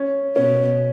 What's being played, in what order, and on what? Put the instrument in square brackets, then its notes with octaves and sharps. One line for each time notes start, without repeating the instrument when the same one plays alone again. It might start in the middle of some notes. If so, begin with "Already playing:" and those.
Already playing: [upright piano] C#4
[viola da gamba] B2 [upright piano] C#4